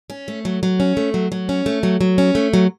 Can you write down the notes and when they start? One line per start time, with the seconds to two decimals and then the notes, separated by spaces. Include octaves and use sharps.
0.10 C#4
0.28 A3
0.45 F#3
0.63 F#3
0.80 C#4
0.97 A3
1.14 F#3
1.32 F#3
1.49 C#4
1.66 A3
1.83 F#3
2.01 F#3
2.18 C#4
2.35 A3
2.54 F#3